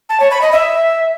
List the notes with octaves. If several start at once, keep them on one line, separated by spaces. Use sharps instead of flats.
A5
C#5
B5
D#5
E5